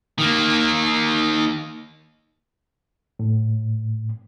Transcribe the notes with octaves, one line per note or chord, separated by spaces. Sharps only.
D#3 A#3
A2